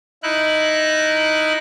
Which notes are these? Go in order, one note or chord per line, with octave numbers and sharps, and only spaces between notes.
D#4 E4 F#6